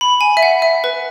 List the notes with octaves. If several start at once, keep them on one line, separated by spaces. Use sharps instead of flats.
B5
G#5
E5
F#5
E5
B4